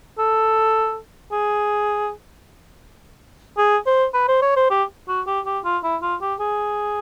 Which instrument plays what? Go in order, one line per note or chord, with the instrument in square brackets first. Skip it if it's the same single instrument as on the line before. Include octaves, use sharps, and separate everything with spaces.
[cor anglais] A4
G#4
G#4
C5
B4
C5
C#5
C5
G4
F#4
G4
G4
F4
E4
F4
G4
G#4